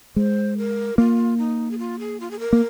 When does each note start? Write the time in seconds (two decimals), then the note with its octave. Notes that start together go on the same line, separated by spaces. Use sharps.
0.16 G#3 C5
0.57 A#4
0.98 A#3 F4
1.38 D#4
1.71 G#4
1.79 F4
1.99 G#4
2.20 F4
2.31 G#4
2.40 A#4
2.53 A#3